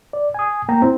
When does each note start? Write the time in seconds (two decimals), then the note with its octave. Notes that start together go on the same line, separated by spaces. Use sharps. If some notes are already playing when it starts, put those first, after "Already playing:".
0.13 D5
0.34 G#5 D#6
0.69 A#3 G5 A#5
0.82 C4 E4